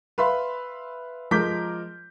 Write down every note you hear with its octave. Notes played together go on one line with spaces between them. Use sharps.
B4 E5 F5 B5 C6
F3 G#3 A#4 D6 G6 B6